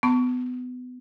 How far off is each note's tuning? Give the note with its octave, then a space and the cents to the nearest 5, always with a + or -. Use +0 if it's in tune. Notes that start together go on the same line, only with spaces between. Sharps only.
B3 +25 A5 +20 C#6 +30